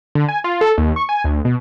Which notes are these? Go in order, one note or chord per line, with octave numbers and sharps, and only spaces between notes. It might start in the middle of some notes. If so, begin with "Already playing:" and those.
D3
G#5
F4
A4
D#2
C#6
G#5
D2
B2